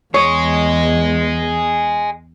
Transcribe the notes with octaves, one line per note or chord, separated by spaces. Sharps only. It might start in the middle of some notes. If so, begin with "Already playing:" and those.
E2 G#4 C#5 D#5